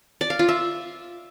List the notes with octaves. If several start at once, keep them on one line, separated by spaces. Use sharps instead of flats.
D5
F5
F4
E5